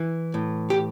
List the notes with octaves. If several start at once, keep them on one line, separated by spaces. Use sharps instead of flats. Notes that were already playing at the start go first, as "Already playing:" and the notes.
Already playing: E3
A2
G4